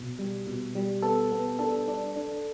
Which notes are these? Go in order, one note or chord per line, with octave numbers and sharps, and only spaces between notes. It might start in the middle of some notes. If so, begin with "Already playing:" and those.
Already playing: B2
G3
B2
G3
B3 A4
B3
D4 A4
D4
D4